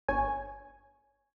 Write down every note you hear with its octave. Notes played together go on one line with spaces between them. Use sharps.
G1 C#5 G#5